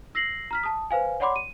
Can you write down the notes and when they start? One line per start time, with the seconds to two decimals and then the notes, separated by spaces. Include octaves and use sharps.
0.15 E6 A#6 C7 F#7
0.51 A#5 F6 B6
0.63 A5 D#6
0.91 B4 C5 F5 G#5
1.20 C#5 D5 F#5 B5 C6 D6
1.36 D#7